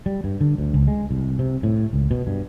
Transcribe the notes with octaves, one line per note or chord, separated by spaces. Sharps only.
G3
G2
D3
D2
C#2
G#3
C2
C3
A2
C#2
B2
G2